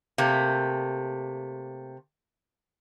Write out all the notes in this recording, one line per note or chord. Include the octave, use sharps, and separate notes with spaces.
C3 A3 A#3